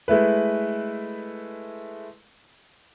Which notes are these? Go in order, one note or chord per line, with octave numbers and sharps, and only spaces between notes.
G#3 A3 E4 B4